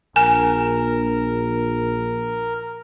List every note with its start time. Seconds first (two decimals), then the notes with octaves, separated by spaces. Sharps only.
0.16 A#1 A#4 G#5